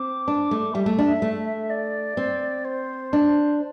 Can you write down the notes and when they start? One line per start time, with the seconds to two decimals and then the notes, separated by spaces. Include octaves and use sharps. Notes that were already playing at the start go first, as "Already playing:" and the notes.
Already playing: C4 D6
0.28 D4
0.51 A3
0.74 G3 E5
0.86 A3
0.98 D4
1.22 A3
1.70 D5
2.17 C4
2.65 C5
3.13 D4